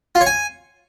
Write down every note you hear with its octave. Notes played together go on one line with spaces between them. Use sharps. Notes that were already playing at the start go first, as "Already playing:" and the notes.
F4
C#5
G#5